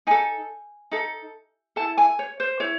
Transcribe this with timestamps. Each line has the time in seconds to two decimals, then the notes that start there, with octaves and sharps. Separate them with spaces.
0.07 D#4 A4 G#5
0.91 D#4 A4
1.76 E4 A4 A5
1.97 G#5
2.19 C#5
2.40 C5
2.60 E4 C#5